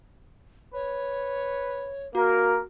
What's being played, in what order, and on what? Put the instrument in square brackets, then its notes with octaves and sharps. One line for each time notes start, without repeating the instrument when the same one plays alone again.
[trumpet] B4 [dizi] C#5
[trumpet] A#3 [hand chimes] F#4 [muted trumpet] A#4